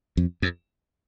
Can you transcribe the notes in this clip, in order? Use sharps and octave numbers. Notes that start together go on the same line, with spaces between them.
F2
F2